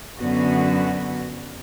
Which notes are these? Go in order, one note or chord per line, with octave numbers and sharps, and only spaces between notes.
F#2 D3 B3 F#4